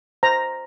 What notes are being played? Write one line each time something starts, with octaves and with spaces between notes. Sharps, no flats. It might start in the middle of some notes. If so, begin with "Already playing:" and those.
C5 A#5